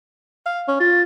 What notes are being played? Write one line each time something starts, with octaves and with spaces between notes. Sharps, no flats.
F5
C#4
F4 A6